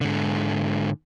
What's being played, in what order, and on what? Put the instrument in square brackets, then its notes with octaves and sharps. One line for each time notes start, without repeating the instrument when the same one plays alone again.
[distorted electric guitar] G#2 D3